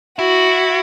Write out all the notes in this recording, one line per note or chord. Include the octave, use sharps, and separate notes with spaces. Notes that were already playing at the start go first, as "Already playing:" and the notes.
E4 F#4